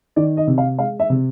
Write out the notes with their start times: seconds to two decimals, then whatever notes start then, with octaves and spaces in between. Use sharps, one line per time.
0.16 D#3 D5
0.37 D#5
0.47 C3
0.58 F5
0.79 G#3 F5
1.00 E5
1.10 C3